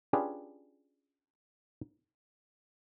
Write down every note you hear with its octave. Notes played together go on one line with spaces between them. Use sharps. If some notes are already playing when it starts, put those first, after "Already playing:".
C#4 D4 F4 G4 G#4 B4